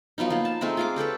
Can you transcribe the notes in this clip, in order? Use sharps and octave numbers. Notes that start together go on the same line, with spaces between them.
F3 F#3 B3 D#4
F3 A#3
A5
G#3 A3 C4 D#4
F4 G#4 D6
G4 A4 B4 C#5